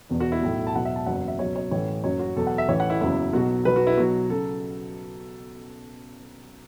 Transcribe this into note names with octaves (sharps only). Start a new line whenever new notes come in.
E1 E2 B2
F#4
E4
B1 A2 F#3
A5
E1 E2 B2 F#3 F#5
E5
A5
F#1 E2 C#3 F#3 F#5
E5
C#2 B2 F#3 C#5
C#5
A1 A2 E3 C#5
F#1 F#2 F#3 C#5
F#4
E2 B2 F#3 A4
F#5
E5
A1 A2 E3 C#5
F#5
E4
F#1 E2 C#3 F#3 E4
B1 B2 F#3 F#4
B1 B2 F#3 B4
F#4
E4
B1 B2 F#3 F#4
C#3 F#3 A4